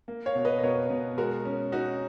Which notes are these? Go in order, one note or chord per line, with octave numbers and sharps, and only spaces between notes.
A#3
C#5 F5
B2
B4 D#5
D#5
B2 A#4 C#5
B2
G#3 F#4 A#4
C#4
C#4 D#4 F#4